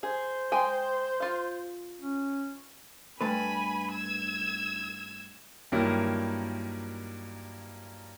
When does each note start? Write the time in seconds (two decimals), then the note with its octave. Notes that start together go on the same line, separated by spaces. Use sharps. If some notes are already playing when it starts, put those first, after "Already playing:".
0.03 G#4 C5
0.52 G#3 G5 G#5
1.20 F4 F5
2.00 C#4
3.21 G2 A3 B4 G#5 B5
3.93 E6 G#6
5.72 G2 D#3 F#3 A#3 E4